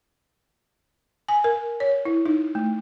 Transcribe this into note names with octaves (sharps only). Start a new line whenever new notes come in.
G#5
A#4
C#5
E4
D#4
A3